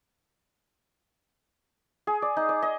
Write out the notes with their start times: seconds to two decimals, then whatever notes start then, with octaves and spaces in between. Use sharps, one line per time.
2.07 G#4
2.22 D5
2.37 D#4
2.49 D5
2.62 D#5